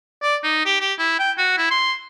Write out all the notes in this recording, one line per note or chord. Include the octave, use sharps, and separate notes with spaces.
D5
D#4
G4
G4
E4
G5
F#4
E4
C6